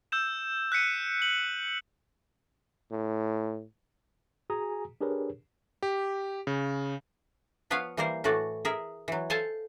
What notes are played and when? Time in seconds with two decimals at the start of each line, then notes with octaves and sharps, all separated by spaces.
0.12 E6 G6 E7
0.72 F#6 B6 C#7 D#7
1.22 F#7
2.91 A2
4.50 F#4 G#4 G#5 A#5 D#6
5.01 D4 G4 G#4 A#4 B4 C#5
5.83 G4
6.47 C#3
7.70 F3 B3 B4 C#5 F5
7.97 E3 G3 A#3 A#4 C5
8.24 A2 E3 A3 F#4 D5
8.65 G#4 A#4 E5
9.08 E3 F#3
9.30 A4 C5 F5 G#5 A5